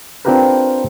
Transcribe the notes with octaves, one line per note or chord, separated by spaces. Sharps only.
C4 D4 F4 G4 A#4 B4